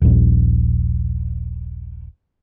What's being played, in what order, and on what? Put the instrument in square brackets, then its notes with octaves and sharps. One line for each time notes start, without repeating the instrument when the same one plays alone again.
[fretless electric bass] D#1 A#1